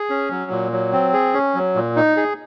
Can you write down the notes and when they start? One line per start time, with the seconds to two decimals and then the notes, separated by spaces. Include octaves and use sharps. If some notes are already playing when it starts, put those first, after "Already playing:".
Already playing: G#4
0.10 C#4
0.31 F#3
0.51 A#2
0.72 F#3
0.93 C4
1.13 G#4
1.34 C#4
1.55 F#3
1.75 A#2
1.96 D#4
2.17 G#4